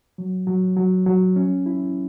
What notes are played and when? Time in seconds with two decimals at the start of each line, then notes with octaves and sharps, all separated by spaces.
0.18 F#3
0.47 F#3
0.77 F#3
1.06 F#3
1.36 C#4
1.66 E4